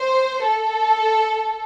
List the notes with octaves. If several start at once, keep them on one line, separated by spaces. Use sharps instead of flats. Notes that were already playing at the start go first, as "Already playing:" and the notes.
Already playing: C5
A4